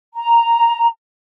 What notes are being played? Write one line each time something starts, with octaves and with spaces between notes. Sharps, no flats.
A#5